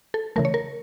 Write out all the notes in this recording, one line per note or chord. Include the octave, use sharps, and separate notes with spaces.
A4
C#3 E3 A3 A#4
C#5
A#4